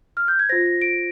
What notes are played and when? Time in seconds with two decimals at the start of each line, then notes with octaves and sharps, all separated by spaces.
0.17 F6
0.28 G6
0.39 G#6
0.49 F4 C5 A#6
0.66 A#6
0.81 D7